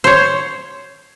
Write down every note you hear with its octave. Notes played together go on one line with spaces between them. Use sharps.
C5 C#5